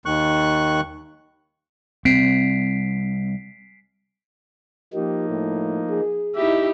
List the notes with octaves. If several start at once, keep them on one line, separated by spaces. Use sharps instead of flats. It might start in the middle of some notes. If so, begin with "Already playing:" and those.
D#2 D#3 C#6 F#6
C2 C4 B6 C7 D7
F3 A#3 D#4 G4
A2
G#4
D#4 E4 G4 E5